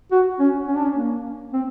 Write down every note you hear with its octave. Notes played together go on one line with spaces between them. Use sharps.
F#4
C#4
C#4
D4
C#4
A#3
C4